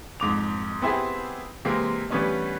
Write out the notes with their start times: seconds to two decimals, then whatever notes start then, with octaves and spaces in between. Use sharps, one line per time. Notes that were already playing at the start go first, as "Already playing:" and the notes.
0.20 F2 G#2 D6 F7
0.82 B3 C4 E4 G4 G#4
1.65 C3 E3 G#3 A#3 C4
2.10 E3 G3 A3 B3 C#4 D4